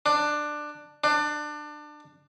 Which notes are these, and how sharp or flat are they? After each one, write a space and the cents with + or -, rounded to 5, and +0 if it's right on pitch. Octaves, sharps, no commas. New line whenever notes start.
D4 +15
D4 +25